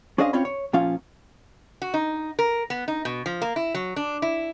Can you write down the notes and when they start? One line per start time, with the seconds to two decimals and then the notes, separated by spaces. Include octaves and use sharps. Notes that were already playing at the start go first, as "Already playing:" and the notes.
0.18 C#4 D4 G#4 C5 D#5 F5
0.33 C4 C#4 F4 C#5 B5
0.45 C#5
0.73 A#2 F3 C#4 F4 F5
1.82 F#4
1.94 D#4
2.39 A#4
2.70 B3
2.88 D#4
3.05 B2
3.26 F3
3.42 A#3
3.56 E4
3.74 F#3
3.96 D4
4.22 E4